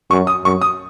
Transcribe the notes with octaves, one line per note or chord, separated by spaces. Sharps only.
F#2 C#6
D#6
F#2 C#6
D#6